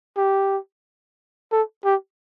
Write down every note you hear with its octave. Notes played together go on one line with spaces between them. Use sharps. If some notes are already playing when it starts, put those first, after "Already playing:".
G4
A4
G4